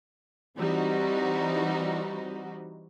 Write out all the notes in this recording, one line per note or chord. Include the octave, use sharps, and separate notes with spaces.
E3 G3 C4 D#4 F#4